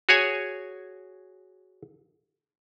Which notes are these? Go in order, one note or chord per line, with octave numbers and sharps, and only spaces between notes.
F#4 G#4 C#5 G#5